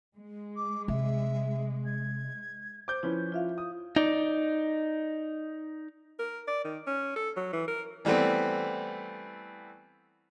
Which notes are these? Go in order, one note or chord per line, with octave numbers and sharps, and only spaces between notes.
G#3
D6
C3 E5
G#6
C5 D6 G6
F3 C#4 E4 B4
F4 E5 F5
D#6
D#4 D5
A#4
D5
D#3
C#4
A4
F#3
E3
A#4
E3 G3 A3 B3 C4